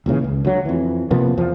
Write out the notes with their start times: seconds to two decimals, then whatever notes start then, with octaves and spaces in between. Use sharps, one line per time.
0.06 D#1 A#2 C#3 E3
0.24 C#2
0.45 D2 F#3
0.65 F2 E3
1.11 C3 F3 A#3 B3
1.37 E2 F3